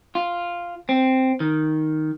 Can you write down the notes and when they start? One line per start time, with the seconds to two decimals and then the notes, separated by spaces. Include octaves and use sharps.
0.15 F4
0.89 C4
1.40 D#3